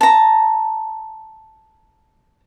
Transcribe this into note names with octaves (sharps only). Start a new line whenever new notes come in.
A5 A#5